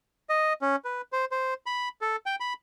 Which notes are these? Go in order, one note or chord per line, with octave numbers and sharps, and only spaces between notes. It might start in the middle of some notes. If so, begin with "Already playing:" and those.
D#5
C#4
B4
C5
C5
B5
A4
G5
B5